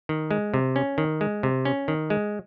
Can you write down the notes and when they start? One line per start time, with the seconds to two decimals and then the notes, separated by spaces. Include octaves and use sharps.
0.09 D#3
0.31 G#3
0.54 C3
0.76 C#4
0.98 D#3
1.21 G#3
1.43 C3
1.65 C#4
1.88 D#3
2.10 G#3